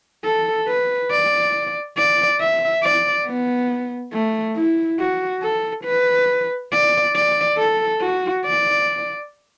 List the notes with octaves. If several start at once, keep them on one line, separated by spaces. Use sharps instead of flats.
A4
B4
D5
D5
E5
D5
B3
A3
E4
F#4
A4
B4
D5
D5
A4
F#4
D5